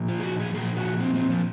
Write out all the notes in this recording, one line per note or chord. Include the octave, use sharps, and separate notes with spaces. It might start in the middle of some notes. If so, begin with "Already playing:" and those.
Already playing: A#2 F3
F4
G#4
F#4
G#4
A#2 F3 G#4
F#4
C4
C4
F3